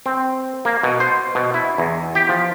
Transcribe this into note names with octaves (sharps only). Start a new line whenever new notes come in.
C4
A#3
B2
C5
B2
E4
E2
G4
F3